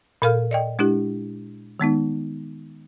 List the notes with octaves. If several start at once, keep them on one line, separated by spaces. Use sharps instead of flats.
A#2 A4 A#4 F5 F6
D5 D#5 G5
G#3 D4 E4 G4
D#3 G#3 B3 D#4